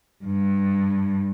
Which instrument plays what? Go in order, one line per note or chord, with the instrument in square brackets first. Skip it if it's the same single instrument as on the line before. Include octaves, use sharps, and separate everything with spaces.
[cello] G2